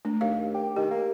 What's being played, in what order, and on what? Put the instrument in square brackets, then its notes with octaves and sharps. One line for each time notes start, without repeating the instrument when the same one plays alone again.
[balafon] A3 D4
[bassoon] D#2 [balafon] F5
[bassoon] G4
[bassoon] D#3 [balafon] G4
[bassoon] A#3